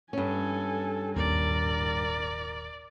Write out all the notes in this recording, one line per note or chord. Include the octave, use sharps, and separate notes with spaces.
G2 C#4 A4 G#5
D#1 G#1 D#2 A#4 D5